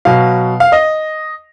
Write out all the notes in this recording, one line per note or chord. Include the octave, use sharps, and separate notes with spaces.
B2 F#3 F5
F5
D#5